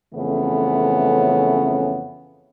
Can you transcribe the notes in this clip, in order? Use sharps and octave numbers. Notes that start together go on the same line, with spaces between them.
F2 C#3 E3 A3 B3 C#4